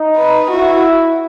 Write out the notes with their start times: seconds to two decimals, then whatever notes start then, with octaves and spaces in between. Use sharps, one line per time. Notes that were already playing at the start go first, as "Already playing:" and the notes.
Already playing: D#4
0.16 B4
0.50 E4 F#4